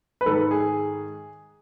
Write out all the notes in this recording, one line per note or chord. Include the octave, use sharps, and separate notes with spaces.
B4
G#2 D#3 G#3 A4
G#4